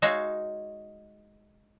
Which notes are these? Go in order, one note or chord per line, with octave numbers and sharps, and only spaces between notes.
G#3 D#4 F#4 C#5 E5 F5